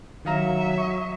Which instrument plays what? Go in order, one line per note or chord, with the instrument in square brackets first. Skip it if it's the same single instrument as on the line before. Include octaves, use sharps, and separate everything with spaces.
[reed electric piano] D#3 F5 A#5 [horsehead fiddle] F#3 E5
[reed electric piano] C#6